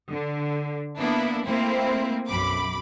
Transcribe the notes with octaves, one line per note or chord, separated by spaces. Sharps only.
D3
A#3 B3 D4 E4
A3 A#3 C4 E4
B1 F#2 B5 D6